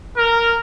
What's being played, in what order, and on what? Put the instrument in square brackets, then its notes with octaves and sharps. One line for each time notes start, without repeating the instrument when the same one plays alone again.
[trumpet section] A#4